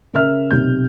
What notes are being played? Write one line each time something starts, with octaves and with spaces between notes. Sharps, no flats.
C#3 A#4 E5 F6
B1 C3 G6